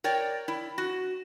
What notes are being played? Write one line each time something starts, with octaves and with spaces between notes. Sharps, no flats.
A#4 C#5 D5 G5
E4
F#4